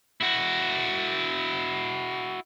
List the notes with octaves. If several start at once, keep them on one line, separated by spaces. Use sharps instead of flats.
E4 F#4